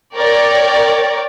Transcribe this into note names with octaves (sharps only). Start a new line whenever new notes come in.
A#4 C#5 D5 G5